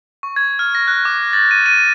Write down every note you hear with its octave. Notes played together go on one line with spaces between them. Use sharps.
C#6
G#6
F6
A#6
F#6
D6
A6
D#7
D#7